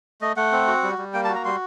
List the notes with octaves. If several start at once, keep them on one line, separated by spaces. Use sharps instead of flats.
A3 D#5
A3 F#5
C4
F#4
G3
G3
A#3 G5
A5
F#4
A#5
G3 C6